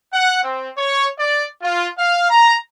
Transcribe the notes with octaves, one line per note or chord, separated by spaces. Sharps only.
F#5
C4
C#5
D5
F4
F5
A#5